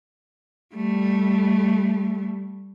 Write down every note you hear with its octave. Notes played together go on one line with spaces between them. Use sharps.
G3 A3